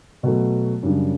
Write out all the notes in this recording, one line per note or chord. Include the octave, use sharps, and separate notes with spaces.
B2 F#3 A3
F#2 C#3 G3 D4